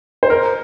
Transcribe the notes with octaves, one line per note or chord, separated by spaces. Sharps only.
C5
A#4